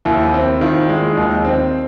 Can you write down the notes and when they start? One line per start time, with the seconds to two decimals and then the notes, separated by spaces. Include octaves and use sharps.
0.05 D#2 E4
0.34 C4
0.61 D#3 F4
0.89 G#3
1.17 D#2 D#4
1.45 C4